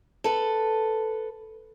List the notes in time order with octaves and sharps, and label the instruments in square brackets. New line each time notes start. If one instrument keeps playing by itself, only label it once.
[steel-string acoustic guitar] A4 B4